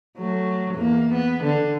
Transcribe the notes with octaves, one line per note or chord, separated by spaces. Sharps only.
F#3 A3
E2 A#3
B3
D3